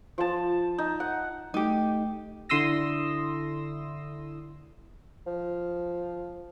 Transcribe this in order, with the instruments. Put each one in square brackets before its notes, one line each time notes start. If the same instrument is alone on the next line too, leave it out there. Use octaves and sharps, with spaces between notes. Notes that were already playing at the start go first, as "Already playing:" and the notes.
[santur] F3 A5
D#4
F#5
[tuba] A3 [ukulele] D#4 G4
[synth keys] D3 E4 C6 D#6 E6 A#6
[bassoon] F3